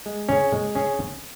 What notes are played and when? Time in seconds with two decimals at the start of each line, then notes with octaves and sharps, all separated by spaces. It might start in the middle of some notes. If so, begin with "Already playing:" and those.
0.06 G#3
0.29 C#4 G#4
0.53 G#3
0.75 C#4 G#4